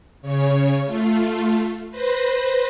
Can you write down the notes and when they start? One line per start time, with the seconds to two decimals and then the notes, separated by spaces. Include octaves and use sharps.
0.22 C#3 C#5
0.86 A3 F4
1.90 B4 C5 A#6